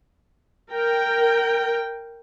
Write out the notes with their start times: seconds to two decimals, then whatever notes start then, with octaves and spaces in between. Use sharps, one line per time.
0.72 A#4 G5